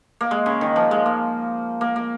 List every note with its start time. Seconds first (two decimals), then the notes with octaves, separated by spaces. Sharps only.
0.21 A#3
0.31 G#3
0.46 C#3
0.61 D#3
0.76 F3
0.91 G#3
1.06 A#3
1.81 A#3
1.96 A#3